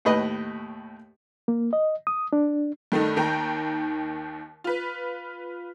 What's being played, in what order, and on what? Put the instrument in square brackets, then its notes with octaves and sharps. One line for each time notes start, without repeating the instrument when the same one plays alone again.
[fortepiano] D#2 A2 B4 D#5
[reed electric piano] A#3
D#5
D#6
D4
[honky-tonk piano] G2 D#3 A3 D#4
D#2 D#3 G5 A#5
F4 B4